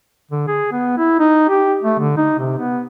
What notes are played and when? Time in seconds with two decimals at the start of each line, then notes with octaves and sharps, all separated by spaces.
0.31 D3
0.48 G#4
0.72 B3
0.98 E4
1.20 D#4
1.49 G4
1.83 A3
1.99 D3
2.17 D#4
2.39 C3
2.59 B3